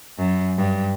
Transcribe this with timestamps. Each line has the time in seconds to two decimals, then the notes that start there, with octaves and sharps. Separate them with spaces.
0.18 F#2
0.56 G2